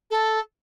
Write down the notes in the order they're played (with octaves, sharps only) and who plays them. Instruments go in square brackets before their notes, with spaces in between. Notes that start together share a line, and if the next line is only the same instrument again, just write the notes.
[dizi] A4